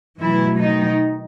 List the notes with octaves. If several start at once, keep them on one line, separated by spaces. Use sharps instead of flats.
B2 E3 F#3 A3 E4
D#3 D#4